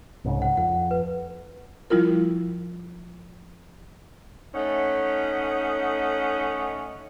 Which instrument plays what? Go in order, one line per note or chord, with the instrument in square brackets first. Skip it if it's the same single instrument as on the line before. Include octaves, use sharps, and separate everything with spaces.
[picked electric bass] C2 G#2 C#3
[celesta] F#5
[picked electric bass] F2 [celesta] F#5
[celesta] B4
[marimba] F3 G3 E4 F4 A#4
[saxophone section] A3 C#4 D#4 F#5